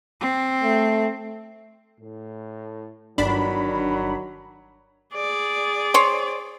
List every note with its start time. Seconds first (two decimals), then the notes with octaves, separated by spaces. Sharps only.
0.20 C4
0.64 A3
2.00 A2
3.18 G1 D#3 F#3 D4 B5
5.15 G#4 D5
5.94 C5 C#5